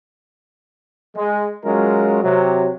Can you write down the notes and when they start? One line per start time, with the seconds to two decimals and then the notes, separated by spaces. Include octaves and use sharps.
1.15 G#3
1.64 F#3 G#3 C#4 F4 A#4
2.23 C3 F#3